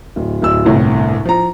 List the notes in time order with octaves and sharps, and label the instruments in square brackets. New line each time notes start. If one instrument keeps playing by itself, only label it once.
[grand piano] D1
D1 E6
G1 C2 A2
F3 A#5